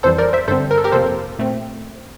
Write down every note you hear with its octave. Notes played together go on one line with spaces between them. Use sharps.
F2 E3 G3 A4 C5
A#4 D5
C5 E5
G2 D3 G3 C4 A4 C5
A#4
A4
G4 A#4
F2 C3 F3 A#3 A4 C5
A#2 A3 C4